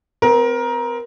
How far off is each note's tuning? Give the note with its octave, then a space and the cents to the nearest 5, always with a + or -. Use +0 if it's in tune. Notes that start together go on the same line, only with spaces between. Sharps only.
C4 -30 A#4 +20